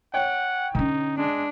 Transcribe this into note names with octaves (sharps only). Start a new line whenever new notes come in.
C#5 F#5 G5
D3 C#4 D#4
G#3 D4